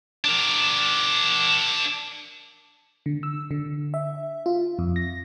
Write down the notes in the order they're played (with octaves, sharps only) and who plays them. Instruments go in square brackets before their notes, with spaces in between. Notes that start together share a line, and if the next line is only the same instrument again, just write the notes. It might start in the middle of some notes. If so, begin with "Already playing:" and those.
[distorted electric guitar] D4 A#4
[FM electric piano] D3
E6
D3
E5
F4
F2
A#6